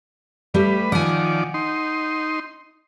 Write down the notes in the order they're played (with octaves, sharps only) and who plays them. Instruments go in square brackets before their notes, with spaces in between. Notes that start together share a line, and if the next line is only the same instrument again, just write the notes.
[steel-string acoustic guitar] G3 A3 G4 [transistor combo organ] B4
[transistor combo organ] D#3 F3 D5 [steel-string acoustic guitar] F#5 G#5
[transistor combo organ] D#4 C6